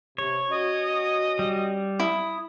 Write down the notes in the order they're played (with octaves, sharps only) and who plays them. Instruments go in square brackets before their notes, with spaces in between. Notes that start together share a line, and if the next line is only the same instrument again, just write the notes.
[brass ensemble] C3 [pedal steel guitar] C#5
[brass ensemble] C#4 F#4 [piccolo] D#5
[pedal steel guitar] G3
[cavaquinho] E4 [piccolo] D#6